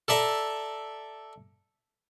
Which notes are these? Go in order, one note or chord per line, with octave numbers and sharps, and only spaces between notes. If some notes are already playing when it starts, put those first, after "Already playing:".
A4 D5 E5 A#5